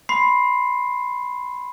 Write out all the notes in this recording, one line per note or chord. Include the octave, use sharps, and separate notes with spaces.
B5 C6 C7